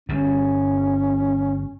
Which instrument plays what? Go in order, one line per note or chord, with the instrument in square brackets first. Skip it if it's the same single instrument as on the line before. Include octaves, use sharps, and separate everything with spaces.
[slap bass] G1 G2 [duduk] C#4